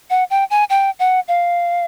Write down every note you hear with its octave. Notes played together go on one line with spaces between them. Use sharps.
F#5
G5
G#5
G5
F#5
F5